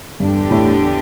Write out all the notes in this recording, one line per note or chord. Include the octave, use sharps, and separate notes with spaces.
E2 G2 D3 G3 D4 G4
A2